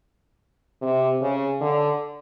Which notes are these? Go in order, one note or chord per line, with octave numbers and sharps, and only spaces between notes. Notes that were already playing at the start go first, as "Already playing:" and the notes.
C3
C#3
D3